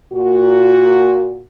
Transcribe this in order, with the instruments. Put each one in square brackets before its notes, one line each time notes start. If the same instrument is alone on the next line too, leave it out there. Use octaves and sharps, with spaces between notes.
[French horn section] A#2 F#4